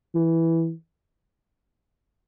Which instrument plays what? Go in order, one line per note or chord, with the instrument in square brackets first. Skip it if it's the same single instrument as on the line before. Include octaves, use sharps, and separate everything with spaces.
[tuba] E3